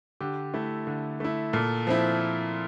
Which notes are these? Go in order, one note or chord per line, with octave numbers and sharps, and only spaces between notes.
D3 G4
A3 E4
D3
A3 E4
A#2 A4
F3 C4 E4